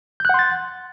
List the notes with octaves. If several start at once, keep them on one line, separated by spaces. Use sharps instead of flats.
F#5 C6 F#6 G6 A6